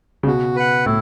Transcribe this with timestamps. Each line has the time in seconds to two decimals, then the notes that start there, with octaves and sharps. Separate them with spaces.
0.23 C#3
0.27 B2 F#4
0.56 B4 F#5
0.86 A2 E4